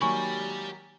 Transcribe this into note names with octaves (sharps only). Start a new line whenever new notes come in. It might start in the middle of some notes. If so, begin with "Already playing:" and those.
D#3 F#3 A#3 G4 G#5 B5 C#6